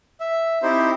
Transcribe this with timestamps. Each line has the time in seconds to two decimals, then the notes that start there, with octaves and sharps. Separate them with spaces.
0.20 E5
0.63 C4 D#4 E4 G4 C5